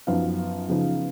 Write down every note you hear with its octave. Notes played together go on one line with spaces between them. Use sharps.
F#2 F3 B3 D#4 F5
C#3 F3 B3 D#4